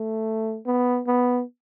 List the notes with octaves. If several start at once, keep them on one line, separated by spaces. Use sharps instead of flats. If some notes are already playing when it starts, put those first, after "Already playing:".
Already playing: A3
B3
B3